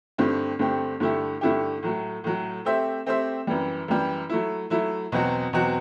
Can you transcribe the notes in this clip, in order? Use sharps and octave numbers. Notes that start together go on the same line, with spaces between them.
G2 D3 A3 C4 G4
G2 D3 A3 C4 G4
G2 D3 A3 E4 G4
G2 D3 A3 E4 G4
A2 F#3 A3
A2 F#3 A3
A3 C4 G4 C5 E5
A3 C4 G4 C5 E5
F#2 E3 G3
F#2 E3 G3
F#3 A3 E4
F#3 A3 E4
E2 B2 F#3 C4 F#4
E2 B2 F#3 C4 F#4